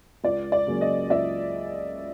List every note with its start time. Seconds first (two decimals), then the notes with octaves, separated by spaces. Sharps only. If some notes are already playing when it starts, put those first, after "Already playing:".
0.24 C#2 D5
0.52 D5
0.67 C#3 F#3 A#3 C#4
0.81 D#5
1.10 C#2 D5 E5